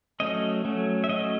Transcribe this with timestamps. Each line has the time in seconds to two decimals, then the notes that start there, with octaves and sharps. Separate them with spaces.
0.20 F#3 A3 C#4 D#5
0.65 F#3 A3 C#4
1.04 E5
1.09 F#3 A3 C#4 D#5